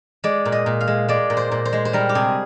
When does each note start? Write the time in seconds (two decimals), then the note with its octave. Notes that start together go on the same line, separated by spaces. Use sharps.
0.24 G#3 D5
0.45 A#2
0.52 D#5
0.66 A#2
0.81 F5
0.87 G#3
1.08 G#3 D5
1.30 A#2
1.37 C5
1.51 A#2
1.65 C5
1.73 G#3
1.85 C5
1.93 G3 A#4
2.09 G4
2.15 C3 G#4